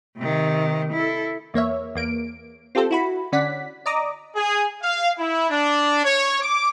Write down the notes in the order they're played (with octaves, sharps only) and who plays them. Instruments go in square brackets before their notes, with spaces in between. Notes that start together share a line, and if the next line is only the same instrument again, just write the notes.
[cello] C3 D#3
E4 A4
[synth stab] E2 A#3 C#5 E5
E2 A#3 D7
C4 F4 G4 A4 C5
E4 F#4 B5
D3 C#4 D5 F#5 B6
D5 D#5 A#5 D6 D#6
[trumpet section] G#4
F5
E4
D4
C#5
D6